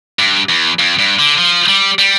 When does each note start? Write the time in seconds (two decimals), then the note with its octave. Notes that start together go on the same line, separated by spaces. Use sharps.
0.19 G2
0.49 E2
0.79 F2
0.99 G2
1.19 D3
1.38 F3
1.69 G3
1.99 G3